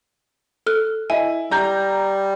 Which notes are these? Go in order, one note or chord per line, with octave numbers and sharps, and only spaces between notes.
A4 F6 F#6
E4 D#5 G#5
G3 A#5 G6